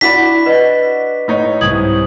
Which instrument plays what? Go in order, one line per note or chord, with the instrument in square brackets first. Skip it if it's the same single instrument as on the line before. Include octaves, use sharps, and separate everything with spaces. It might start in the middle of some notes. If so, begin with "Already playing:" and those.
[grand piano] D4 F#4 D5 [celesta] E4 B5 [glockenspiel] B6
[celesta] B4 D#5
[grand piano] A2 D#4 C#5
[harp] C2 G#2 [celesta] D#6 G#6 F#7